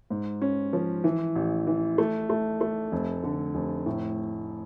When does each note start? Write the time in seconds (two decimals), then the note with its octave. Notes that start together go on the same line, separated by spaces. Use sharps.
0.10 G#2
0.42 C#4
0.73 F3
1.04 E3
1.36 A1
1.67 E3
1.98 A3
2.30 A3
2.61 A3
2.92 F1
3.23 D3
3.55 F1
3.86 A2